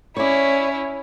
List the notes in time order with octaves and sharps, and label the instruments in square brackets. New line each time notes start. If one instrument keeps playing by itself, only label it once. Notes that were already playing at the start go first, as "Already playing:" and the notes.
[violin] C#4 E4 [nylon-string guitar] C#5 D5